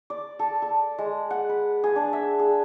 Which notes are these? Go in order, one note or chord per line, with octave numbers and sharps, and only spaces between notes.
D5
A4
A4
G#3
F#5
B4
G#4
D4
E5
G#4